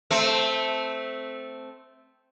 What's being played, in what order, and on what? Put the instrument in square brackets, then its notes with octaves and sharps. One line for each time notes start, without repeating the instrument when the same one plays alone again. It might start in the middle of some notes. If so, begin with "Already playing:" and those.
[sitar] A3 C4